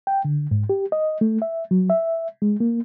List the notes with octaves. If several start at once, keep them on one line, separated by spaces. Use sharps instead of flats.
G5
D3
G#2
G4
D#5
A3
E5
F#3
E5
G#3
A#3